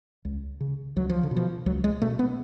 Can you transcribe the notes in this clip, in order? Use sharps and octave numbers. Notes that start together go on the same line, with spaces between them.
C#2
C#3
C#2 F#3
F3
D3
B2
F3
C#2 F#3
G#3
B2 A3
B3